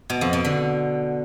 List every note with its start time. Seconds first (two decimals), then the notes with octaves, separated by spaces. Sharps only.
0.10 B2
0.21 F2
0.33 B2
0.45 D3